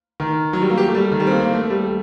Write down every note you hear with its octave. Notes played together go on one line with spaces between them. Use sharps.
D#3
F#3
G3
A#3
G4
A3
G3
D#3
G3
C4
A#3
A#3
A3
A3
G3
G3